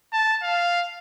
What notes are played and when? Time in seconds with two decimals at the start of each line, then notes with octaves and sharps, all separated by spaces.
0.13 A5
0.43 F5